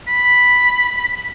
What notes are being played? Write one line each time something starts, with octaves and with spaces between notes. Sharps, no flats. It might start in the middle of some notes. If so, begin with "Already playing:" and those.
B5